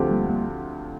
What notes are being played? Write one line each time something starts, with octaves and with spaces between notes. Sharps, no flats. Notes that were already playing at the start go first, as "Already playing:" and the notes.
Already playing: D2 D3 F3 C4 G4
G3 A#3
G3 A#3